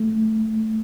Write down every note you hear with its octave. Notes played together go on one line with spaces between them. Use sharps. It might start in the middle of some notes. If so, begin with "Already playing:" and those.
Already playing: A3